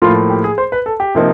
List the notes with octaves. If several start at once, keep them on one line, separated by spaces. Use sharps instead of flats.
A2 F3 A#3 F4
G4
G#4
C5
B4
A4
G4
C3 F3 A#3 D#4